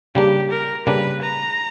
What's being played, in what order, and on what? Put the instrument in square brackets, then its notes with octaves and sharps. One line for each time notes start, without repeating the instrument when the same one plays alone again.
[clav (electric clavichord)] C#3 G3 A#3 D4 [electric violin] G4
[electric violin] A#4
[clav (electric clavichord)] C#3 G3 A#3 D4 [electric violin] B4
[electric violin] A#5